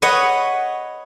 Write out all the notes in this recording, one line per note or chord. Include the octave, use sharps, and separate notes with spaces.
B4 C#5 D#5 F#5